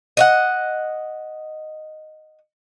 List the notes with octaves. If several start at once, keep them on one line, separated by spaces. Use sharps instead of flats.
D#5 E5 F#5